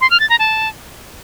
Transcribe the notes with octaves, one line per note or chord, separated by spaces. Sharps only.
C6
F6
A6
A#5
A5